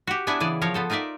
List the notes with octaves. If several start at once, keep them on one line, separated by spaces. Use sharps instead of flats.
F#4 G4
B3 D4 E4 D5 E5 G#5
C#3 E3 G#4 D5
F3 A#4 C#5 F5
B3 A4 C5
D#4 F4 A#4 D5 E5